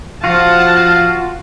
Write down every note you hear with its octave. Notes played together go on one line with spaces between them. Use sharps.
F3 F4 F#4 F5 F#5 A5